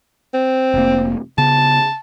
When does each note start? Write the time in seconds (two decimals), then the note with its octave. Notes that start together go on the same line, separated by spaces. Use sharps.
0.34 C4
0.74 F1 A#3
1.38 C#3 B3 A5